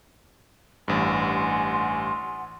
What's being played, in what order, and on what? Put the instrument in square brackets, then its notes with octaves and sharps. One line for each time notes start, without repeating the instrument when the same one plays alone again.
[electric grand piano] A1 G2 [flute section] F#5 G#5 C6